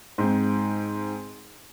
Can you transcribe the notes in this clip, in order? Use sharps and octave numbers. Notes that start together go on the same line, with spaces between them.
G#2 C4